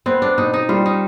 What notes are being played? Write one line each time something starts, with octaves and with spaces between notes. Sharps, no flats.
B3 C4
D4
B2 D#4
D#4
G3 F4
D#4